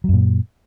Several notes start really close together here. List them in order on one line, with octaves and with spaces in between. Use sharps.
F#3 F#2 A#2